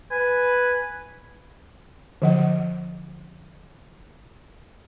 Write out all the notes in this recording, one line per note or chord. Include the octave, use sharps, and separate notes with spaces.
B4 G#5
D3 F3 F#5